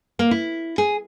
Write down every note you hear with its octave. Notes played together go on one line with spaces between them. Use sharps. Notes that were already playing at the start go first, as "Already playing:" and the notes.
A#3
E4
G#4